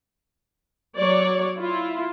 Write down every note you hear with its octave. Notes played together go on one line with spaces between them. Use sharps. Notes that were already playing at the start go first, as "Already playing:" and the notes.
F#3 C#5 D5
E4 F4